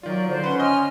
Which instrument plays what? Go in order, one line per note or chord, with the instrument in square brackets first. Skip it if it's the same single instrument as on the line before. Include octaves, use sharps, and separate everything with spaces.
[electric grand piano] D#3 F4 [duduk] F#3 [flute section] D5
[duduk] D3 [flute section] C5 D5
[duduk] C#4 [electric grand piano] B4 F#5 [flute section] C6
[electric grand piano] D#5 [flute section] G#5 F6